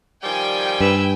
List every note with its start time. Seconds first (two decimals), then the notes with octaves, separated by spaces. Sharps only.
0.23 D#3 F3 G3 G5 G#5
0.80 G2 B4 E6